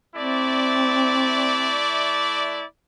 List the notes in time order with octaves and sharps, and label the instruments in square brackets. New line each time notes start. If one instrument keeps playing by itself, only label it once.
[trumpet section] A3 E4 D5 [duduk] C4